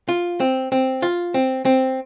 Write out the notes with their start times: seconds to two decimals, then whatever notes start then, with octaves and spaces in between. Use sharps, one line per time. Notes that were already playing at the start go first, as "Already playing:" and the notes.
0.09 F4
0.40 C4
0.72 C4
1.02 F4
1.34 C4
1.65 C4